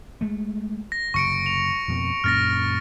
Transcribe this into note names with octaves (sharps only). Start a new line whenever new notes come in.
G#3 A3
A#6
F#1 C3 C#6 C#7 D7
F7
F2 B2 C4
F#2 A#2 C#4 F6 A6 A#6